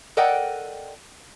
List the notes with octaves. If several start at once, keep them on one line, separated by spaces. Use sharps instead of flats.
A4 A#4 D5 D#5 F#5 G5